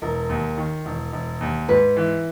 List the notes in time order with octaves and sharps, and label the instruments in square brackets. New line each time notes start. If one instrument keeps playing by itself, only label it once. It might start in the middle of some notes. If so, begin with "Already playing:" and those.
[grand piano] E1 [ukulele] A#4
[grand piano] D#2
D#3
E1
E1
D#2
[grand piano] G#2 [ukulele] B4
[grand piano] E3